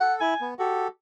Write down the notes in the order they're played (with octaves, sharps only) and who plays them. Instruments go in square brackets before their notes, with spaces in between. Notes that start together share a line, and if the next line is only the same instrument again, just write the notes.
[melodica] A4 [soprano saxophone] F#5
[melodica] E4 [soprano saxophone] G#5
[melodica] B3
[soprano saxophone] F#4 [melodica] G4 A4